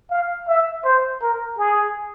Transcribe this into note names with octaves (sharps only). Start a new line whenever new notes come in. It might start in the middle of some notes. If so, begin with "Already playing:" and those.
F5
E5
C5
A#4
G#4